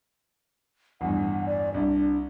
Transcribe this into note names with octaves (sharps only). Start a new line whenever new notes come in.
A1 E2 G2 F#5
D5
C2 D4